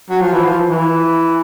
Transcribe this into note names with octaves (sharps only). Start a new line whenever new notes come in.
F#3
F3
E3
F3
E3